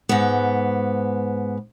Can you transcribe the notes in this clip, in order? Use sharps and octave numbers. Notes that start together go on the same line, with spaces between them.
G#2 B3